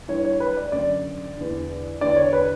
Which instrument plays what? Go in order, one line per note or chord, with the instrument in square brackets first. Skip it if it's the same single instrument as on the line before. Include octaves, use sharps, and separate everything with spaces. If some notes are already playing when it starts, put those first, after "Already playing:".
[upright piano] G2 E3 C#5
C#5
B4
D5
F#2 D3 D5
E2 D3
E2 D3 D5
C#5
B4